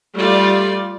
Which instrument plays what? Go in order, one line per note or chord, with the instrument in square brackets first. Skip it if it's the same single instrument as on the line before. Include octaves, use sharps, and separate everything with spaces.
[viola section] G3 A3 F4 D5